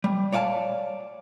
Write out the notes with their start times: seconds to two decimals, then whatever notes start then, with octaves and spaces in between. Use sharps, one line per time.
0.04 G3
0.33 C#5 D5 F5 G#5 A5